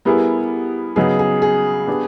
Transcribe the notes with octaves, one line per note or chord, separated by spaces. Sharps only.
G3 B3 E4 G#4 A#4
C#3 F#3 B3 D#4 G#4
G#4
G#4
B3 D4 G4